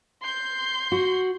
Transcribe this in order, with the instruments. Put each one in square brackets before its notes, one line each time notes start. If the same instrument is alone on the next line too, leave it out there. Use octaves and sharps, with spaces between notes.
[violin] C6 G6
[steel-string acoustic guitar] F#4